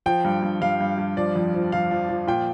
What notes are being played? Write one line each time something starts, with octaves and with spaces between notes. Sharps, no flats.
F3 G5
G2
G2
G2 F5
G2
G2
F3 D5
F2
F3
F2 F5
F3
F3
A#2 G5